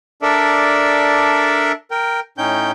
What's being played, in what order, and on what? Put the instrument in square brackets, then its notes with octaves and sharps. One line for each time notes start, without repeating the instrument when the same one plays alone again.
[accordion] D4 A4 A#4 D5 E5
A#4 G5
A2 C#4 D#4 G5 G6